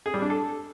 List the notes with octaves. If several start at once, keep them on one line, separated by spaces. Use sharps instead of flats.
G#4
G3
D4
A4